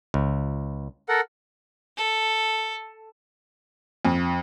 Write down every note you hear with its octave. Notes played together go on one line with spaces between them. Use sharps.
C#2
A4 A#4 F#5
A4
F2